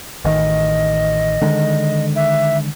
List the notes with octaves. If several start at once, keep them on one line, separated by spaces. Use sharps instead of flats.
A1 D#3 D#5
D3 D#3 G#3
E5